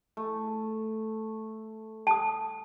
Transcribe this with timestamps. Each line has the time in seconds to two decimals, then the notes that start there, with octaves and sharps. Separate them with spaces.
0.17 A3
2.07 A5 D#6